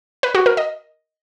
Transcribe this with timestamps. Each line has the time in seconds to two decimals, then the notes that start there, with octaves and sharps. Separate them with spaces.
0.23 B4
0.35 F#4
0.46 A#4
0.57 D#5